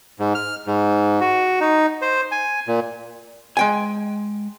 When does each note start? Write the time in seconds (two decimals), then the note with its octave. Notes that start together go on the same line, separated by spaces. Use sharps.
0.19 G#2
0.35 F6
0.67 G#2
1.21 F#4
1.60 D#4
2.02 C5
2.31 G#5
2.68 A#2
3.57 G#3 G5 G#5